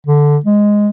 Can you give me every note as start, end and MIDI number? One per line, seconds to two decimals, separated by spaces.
0.06 0.37 50
0.45 0.90 56